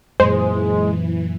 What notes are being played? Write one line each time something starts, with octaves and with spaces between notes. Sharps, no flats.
F#2 A#2 E3 G#3 C5